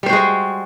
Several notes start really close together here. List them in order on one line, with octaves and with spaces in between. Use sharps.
G3 C5 F#4 G#3